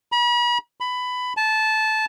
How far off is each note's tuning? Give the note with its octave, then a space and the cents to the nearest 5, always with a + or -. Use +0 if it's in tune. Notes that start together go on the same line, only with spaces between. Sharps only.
B5 -40
B5 +15
A5 -15